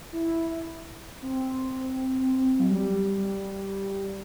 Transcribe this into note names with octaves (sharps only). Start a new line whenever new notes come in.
E4
C4
F#3
G3